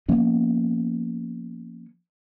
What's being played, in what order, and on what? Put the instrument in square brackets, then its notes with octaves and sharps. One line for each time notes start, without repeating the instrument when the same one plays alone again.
[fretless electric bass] F3 A#3 B3 C#4